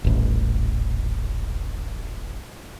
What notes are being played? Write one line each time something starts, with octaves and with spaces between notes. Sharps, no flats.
D#1 A1